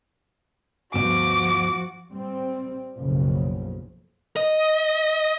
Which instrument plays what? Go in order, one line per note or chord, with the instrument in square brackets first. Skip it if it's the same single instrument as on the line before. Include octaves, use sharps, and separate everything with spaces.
[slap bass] D2 G2 B3 [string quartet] F3 F#4 [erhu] D6
[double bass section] G3 C4
F#1 B1 C#3 F3
[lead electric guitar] D#5